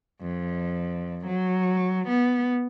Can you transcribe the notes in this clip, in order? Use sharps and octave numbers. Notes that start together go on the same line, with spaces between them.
F2
F#3
B3